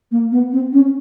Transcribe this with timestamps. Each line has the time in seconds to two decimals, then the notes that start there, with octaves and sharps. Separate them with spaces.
0.11 A#3
0.32 B3
0.52 C4
0.73 C#4